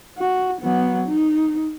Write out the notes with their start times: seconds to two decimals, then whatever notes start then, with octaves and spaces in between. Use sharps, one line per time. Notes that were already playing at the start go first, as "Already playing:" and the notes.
0.18 F#4
0.61 F#3 B3
1.08 D#4